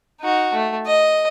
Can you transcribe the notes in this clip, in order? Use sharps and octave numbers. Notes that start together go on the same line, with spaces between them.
D#4 F#4
A3
D#5